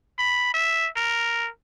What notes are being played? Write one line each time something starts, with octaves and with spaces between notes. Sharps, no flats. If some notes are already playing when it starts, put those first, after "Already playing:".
B5
E5
A#4